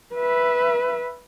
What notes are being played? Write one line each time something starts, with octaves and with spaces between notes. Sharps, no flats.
B4 E5